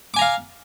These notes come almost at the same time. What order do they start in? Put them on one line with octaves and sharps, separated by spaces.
D6 G#5 A#5 F5